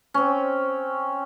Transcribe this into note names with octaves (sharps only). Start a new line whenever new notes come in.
C4 C#4